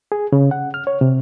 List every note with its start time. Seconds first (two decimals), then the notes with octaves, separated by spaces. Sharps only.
0.12 G#4
0.32 C#3
0.51 F#5
0.74 F6
0.87 C#5
1.01 C3